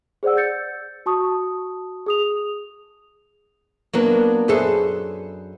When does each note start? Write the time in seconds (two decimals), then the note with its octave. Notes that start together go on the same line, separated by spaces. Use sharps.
0.23 G#4 C5 D5 F#5 E6
0.37 G6 A6 C#7
1.06 F#4 A5 C#6 D#6
2.06 G#4 D#6 F7
3.94 F#3 A#3 B3 D4 A#4
4.48 F#2 G#4 A4 B4 C5